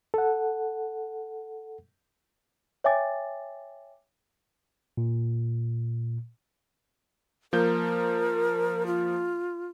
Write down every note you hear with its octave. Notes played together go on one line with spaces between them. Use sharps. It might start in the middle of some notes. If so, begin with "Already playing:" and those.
A4 F#5
C#5 E5 G5 G#5 D6 A6
A#2
F3 A#3 A#4 G6
F4